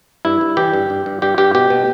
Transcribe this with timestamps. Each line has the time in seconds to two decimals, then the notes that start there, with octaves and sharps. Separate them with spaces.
0.25 G2 E4
0.41 G2
0.57 E3 G4
0.74 G2
0.90 G2
1.06 G2
1.22 G2 G4
1.38 G2 G4
1.55 B2 G4
1.70 B2